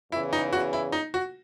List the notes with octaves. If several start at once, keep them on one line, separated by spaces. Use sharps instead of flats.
E2 C#3 E3 E4
D#4
F#4
E4
D#4
F#4